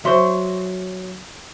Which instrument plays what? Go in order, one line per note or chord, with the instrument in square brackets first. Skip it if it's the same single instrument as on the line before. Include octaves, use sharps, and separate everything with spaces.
[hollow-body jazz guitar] F#3 C5 [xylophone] E5 C6 C#6